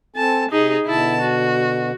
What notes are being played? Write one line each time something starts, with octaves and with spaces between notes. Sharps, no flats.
C4 A4 G#5 A5
C3 D#4 G#4
B2 D3 E4 A5
F#4